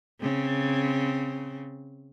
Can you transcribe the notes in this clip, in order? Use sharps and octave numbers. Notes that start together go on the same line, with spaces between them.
C#3 C4